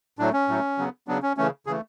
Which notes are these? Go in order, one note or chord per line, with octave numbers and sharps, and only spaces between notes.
A2 F#3 A3 D4
C#4
A2 F#3 A3
C#3 F#3 B3
C#3 F#3 B3 D4
C#4
C#3 E3 A3 C#4
C#3 E3 A3 G#4